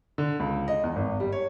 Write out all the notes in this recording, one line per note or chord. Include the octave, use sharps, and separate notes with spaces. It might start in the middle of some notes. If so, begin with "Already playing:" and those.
D3
C#2
D#5
E2
G#1
G3
C#5